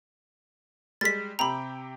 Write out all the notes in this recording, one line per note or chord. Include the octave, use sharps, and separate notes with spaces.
G3 G#3 A6 B6
C3 G4 G5 A#5 B5